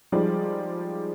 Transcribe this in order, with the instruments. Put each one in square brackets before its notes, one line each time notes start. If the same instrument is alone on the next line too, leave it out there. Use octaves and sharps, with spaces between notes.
[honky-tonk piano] F3 G3 G#3 D#4 D5